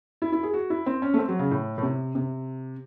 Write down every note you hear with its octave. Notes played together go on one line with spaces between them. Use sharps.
E4
E4
G#4
F#4
E4
C4
C#4
A3
C4
F#3
C#3
A2
A2
C3
C3